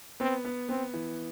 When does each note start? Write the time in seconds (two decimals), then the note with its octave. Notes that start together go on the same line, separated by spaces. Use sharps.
0.20 B3 C4
0.45 B3
0.69 B3 C4
0.94 E3